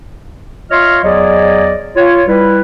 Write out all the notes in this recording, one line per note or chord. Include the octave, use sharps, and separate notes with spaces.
F4 C#5 D#5 E5 C6 F6
E2 F#3 G#4 D5 D#5
F4 C#5
G3 E4 B4